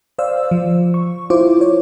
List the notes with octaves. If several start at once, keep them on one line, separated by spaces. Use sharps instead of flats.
C5 D5 F5 E6
F3
C#6
E4 F4 C5 D6
C#5